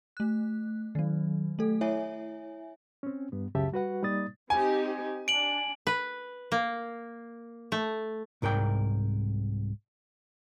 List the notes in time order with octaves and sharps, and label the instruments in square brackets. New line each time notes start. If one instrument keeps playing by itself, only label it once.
[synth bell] A3 F#6
D#3 F#3
A3 A4
E4 C#5 E5 G#5
[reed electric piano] C4 C#4
G2 B3
C#2 F#2 C#3 G4 E5 A5
G3 F#4 B4 F#5
G3 A#3 D#4 D5 D#6 A6
[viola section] C4 D#4 G4 [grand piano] G#5
[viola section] D4 [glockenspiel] D7 F#7
[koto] B4
A#3
A3
[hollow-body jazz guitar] C2 G#2 A#4 D5 G5